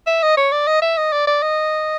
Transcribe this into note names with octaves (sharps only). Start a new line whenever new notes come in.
E5
D#5
C#5
D5
D#5
E5
D#5
D5
D5
D#5